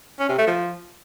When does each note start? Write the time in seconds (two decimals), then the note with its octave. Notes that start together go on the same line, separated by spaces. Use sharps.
0.20 C#4
0.29 C3
0.38 A3
0.47 F3